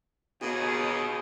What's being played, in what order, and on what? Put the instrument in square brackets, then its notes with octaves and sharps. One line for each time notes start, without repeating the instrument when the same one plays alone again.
[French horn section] D#2 [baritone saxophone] B2 [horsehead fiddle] G#4